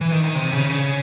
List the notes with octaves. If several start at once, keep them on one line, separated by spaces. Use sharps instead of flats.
E3
D#3
D#3
C3
C#3
C#3